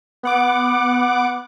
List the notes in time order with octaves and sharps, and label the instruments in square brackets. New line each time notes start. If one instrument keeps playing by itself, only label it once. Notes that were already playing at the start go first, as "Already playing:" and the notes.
[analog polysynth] B3 F#5 D6